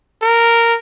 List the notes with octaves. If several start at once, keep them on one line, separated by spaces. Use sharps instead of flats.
A#4